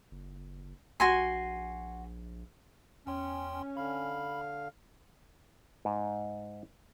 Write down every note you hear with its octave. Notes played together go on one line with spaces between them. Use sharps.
F#1
A#1 F#4 G#5 C6
E2 C#4 G5 C6
D3 F5 B5
G#2